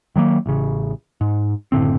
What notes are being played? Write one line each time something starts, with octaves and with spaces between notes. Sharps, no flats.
D#3 F#3 G3 A#3
A1 C#3
G#2
F#1 A2 D3 C4